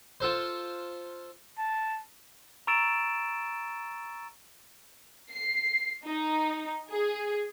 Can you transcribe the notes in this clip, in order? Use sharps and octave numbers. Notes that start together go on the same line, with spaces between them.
F4 A4 C5
A5
A#5 C#6 E6 A6 D7 E7
C7
D#4
G#4